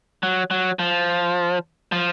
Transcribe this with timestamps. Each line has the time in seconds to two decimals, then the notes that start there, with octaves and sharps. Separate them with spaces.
0.23 F#3
0.51 F#3
0.79 F3
1.92 F3